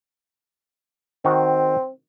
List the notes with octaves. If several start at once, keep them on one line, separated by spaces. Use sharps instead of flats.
D#3 C4 F#4